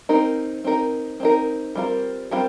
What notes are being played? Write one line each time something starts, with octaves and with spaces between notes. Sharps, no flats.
C4 D#4 A#4
C4 D#4 A#4
C4 D#4 A#4
G3 C4 F4 A#4
G3 C4 F4 A#4